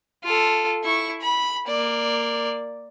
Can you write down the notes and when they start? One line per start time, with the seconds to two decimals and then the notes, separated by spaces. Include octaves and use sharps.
0.24 F4 A4
0.84 E4 C#6
1.21 B5
1.68 A#3 D5